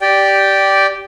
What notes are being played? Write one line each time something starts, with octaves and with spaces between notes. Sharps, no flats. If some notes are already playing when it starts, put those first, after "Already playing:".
G4 D5 G5